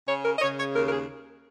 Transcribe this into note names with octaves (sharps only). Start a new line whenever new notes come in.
C#3 C#5
A#4
D#5
C#3 C#5
C#5
D#2 A#4
A#4
G#4